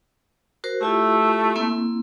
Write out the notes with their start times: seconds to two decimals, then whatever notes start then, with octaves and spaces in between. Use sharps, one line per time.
0.64 F#4 A#4 C5
0.81 A3 E4 F4 G4
1.56 A#3 C4 E4